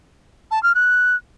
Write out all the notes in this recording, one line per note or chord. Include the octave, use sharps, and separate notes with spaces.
A5
F6
F#6